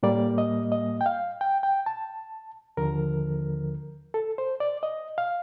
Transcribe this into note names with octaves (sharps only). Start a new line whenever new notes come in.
A2 G3 A#3 D5
D#5
D#5
G5
F5
G5
G5
A5
D#2 D3 F3 A#4
A4
C5
D5
D#5
F5